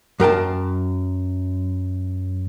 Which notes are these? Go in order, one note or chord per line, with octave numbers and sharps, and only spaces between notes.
F#2 A#4 G5 A5